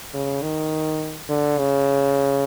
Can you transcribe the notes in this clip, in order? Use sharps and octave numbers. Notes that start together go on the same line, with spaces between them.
C#3
D#3
D3
C#3